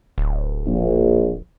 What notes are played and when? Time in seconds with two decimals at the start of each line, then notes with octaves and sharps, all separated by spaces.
0.18 D1
0.66 A#1